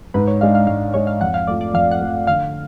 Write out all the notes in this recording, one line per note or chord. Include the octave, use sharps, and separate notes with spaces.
G#2 B4
C#5
G#3 D4 F5
F5
G#2 F5
G#3 D4 C#5
F5
F2 F#5
F5
F3 A3 D5
D5
F2 F5
F#5
F3 A3
D3 F5